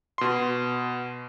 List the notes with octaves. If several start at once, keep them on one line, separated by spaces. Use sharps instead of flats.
B2 C6